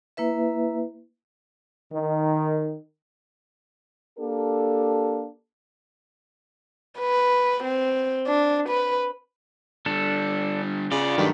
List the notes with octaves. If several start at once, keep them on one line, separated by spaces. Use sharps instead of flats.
A#3 E4 B4 E5
D#3
A#3 D4 G4 A4
B4
C4
D4
B4
D3 G3 D4 A4
C#3 B3 F4 D5
G2 D#3 F#3 A3 G4